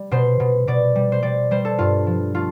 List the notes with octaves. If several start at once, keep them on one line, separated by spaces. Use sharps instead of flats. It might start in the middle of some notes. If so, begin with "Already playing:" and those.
Already playing: G3
B2 C5
B2
B2 D5
G3
C5
G3 D5
G3 C5
A4
G2 F4
F3
A3 F4